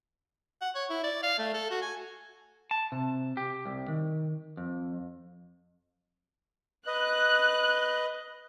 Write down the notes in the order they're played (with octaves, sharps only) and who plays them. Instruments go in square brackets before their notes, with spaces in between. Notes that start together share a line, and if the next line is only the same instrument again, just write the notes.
[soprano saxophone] F#5
C#5
E4
D5
F5
A3
A4
F#4
G#5
[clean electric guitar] A5
C3
G4
C2
D#3
F2
[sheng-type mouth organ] B4 D#5 [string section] F#6